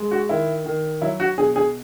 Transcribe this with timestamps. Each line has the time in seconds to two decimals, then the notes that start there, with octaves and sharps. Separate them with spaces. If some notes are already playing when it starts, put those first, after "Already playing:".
Already playing: G#3
0.11 F#4
0.29 D#3 E4
0.66 D#3
1.02 F#3 E4
1.20 F#4
1.38 B2 G#4
1.56 G#4